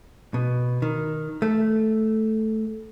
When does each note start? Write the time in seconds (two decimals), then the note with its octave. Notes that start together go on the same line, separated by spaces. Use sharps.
0.34 B2
0.82 D#3
1.42 A3